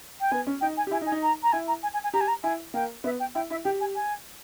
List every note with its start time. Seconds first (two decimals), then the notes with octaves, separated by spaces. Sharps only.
0.21 G5
0.32 B3 G#5
0.47 C#4
0.61 D#4 G5
0.77 G#5
0.87 G4
0.91 E4 G#5
1.01 D#4
1.06 G#5
1.12 D#4
1.23 A#5
1.43 A#5
1.52 E4 G#5
1.68 A#5
1.83 G#5
1.94 G#5
2.04 G#5
2.14 G4 A#5
2.21 G#5
2.28 A#5
2.44 E4 G#5
2.74 A#3 G5
3.04 B3 E5
3.20 G5
3.35 E4 G5
3.50 E4 E5
3.65 G4 G5
3.80 G#5
3.95 G#5